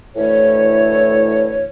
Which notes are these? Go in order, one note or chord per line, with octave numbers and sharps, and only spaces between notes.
D2 A2 E3 A3 C#5